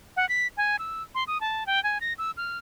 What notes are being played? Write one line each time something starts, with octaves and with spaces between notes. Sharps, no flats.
F#5
B6
G#5
E6
C6
D#6
A5
G5
G#5
A#6
E6
F6